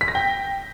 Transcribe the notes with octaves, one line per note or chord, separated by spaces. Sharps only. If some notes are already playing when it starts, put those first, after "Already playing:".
B6
A#6
G5